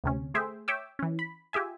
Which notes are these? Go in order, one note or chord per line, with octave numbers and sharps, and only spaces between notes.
D2 C3 C#4
A3 G#4 C5 E5 G5
C#5 E5 G5 D6 E6
E3 C#4
B5
F4 G4 G#4 E5 G#5